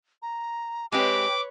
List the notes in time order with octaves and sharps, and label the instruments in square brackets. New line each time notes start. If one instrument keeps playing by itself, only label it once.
[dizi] A#5
[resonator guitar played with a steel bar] G#3 C4 G4 [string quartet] B4 C#5 [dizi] G5 [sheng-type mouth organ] D6